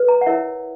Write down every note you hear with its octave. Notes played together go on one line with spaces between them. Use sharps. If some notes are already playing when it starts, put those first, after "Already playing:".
Already playing: B4
A#5
F#5
E4 A#4 C#5 E5